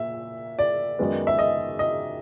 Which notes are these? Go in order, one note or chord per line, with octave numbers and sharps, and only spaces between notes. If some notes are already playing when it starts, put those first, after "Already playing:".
Already playing: A#2 A#3 E5
D5
F#2 D#3 G#3 B3
E5
D#5
D#5